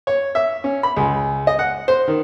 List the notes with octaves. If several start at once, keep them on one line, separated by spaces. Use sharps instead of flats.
C#5
E5
C#4
B5
C#2
D#5
F#5
C5
D#3